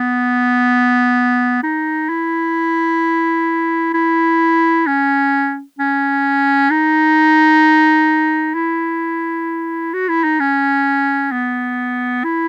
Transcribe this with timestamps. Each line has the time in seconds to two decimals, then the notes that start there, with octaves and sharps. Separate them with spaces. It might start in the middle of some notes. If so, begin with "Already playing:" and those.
Already playing: B3
1.63 D#4
2.09 E4
3.94 E4
4.87 C#4
5.79 C#4
6.70 D#4
8.55 E4
9.94 F#4
10.08 E4
10.24 D#4
10.40 C#4
11.32 B3
12.24 E4